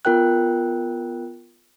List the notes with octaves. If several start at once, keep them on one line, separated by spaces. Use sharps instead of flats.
B3 F4 A#4 G5 F#6